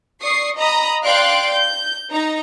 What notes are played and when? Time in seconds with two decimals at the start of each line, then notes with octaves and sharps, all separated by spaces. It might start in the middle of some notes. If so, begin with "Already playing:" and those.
0.21 D5 C#6 D#6 C7
0.56 D#5 A#5 B5 D#6
1.04 D5 F5 G5 C6 F#6 D7
1.51 G6
2.11 D#4 A#5